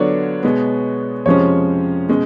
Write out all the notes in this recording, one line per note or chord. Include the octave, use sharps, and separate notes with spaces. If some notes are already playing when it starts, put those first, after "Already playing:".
Already playing: D3 F#3 B3 D4 F4 C#5 D5
B2 G#3 B3
F2 C3 F3 G#3 C#4 C#5
B2 G#3 C#4